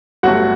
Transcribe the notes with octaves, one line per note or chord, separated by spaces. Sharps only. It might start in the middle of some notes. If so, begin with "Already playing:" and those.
G1 G2 F#3 A3 F#4 F#5